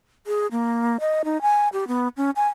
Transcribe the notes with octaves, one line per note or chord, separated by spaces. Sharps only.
G#4
A#3
D#5
D#4
G#5
G4
B3
C#4
G#5